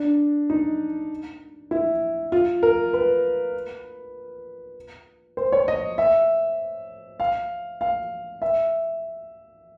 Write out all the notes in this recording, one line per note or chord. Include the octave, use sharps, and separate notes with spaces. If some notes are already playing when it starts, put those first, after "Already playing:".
Already playing: D4
D#4
E4
F4
A#4
B4
C5
C#5
D#5
E5
F5
F5
E5